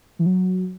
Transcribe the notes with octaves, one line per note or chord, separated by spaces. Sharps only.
E3
F#3